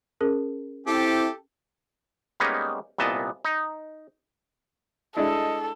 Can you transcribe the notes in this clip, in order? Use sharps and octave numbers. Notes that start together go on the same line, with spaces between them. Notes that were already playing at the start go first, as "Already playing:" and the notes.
C#4 G#4 A#4
C4 E4 G4 A4 G5
G3 G#3 A#3 B3 C#4 D#4
C2 A#2 B3 D#5 A5
D#4
G#3 D4 E4 A4 D#5